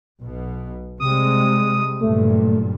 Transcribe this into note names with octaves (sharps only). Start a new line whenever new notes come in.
B1 B2
C3 G3 G#3 D#6
F#1 G2 A#2 A3